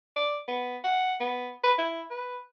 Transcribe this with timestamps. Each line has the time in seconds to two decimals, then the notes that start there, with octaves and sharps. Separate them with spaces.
0.16 D5
0.48 B3
0.84 F#5
1.20 B3
1.64 B4
1.78 E4
2.11 B4